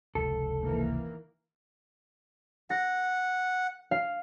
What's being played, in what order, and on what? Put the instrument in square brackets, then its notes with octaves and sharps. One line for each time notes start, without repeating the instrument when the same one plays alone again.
[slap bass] F1 C#2 [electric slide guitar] A4
[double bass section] D#3 E3 A#3
[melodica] F#5 [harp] A#6
[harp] F5